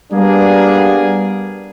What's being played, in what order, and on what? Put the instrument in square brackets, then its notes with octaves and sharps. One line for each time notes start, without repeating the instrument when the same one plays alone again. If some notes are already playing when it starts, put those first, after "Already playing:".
[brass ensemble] G3 A#3 B3 D4 G#4